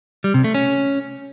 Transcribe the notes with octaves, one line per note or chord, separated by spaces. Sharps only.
G3
C3
A3
C#4